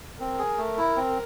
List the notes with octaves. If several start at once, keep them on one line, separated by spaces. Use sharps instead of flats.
C4 A#4
G#4
A3
E4
C4